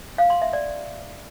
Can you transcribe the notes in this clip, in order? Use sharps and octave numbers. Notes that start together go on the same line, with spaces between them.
F5
C6
E5
D5